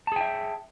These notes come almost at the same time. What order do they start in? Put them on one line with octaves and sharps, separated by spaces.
A5 G#4 G5 E5